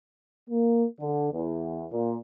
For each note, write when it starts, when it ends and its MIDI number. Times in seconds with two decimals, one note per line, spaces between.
0.49 0.84 58
1.00 1.29 50
1.32 1.85 40
1.92 2.16 46